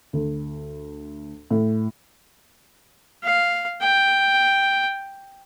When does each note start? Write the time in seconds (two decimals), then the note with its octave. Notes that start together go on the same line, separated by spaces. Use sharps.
0.13 D2
1.50 A2
3.23 F5
3.81 G5